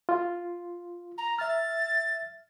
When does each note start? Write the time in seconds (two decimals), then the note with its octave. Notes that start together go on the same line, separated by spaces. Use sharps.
0.09 F4
1.17 A#5
1.39 E5 F6 A6